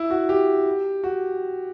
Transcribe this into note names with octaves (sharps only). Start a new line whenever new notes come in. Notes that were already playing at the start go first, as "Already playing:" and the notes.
Already playing: E4
F#4
G4
F#4